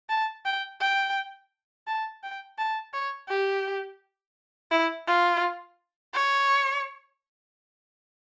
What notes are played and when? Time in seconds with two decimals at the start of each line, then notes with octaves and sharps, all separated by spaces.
0.09 A5
0.46 G5
0.81 G5
1.87 A5
2.23 G5
2.58 A5
2.94 C#5
3.29 G4
4.71 E4
5.07 F4
6.13 C#5